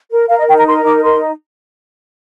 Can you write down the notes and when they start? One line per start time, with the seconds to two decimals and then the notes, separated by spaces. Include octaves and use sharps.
0.11 A#4
0.29 A#4 F5
0.39 D#5
0.48 D#4 G5
0.58 A#5
0.67 A#4 C6
0.85 D#4 D6
1.04 A#4 C6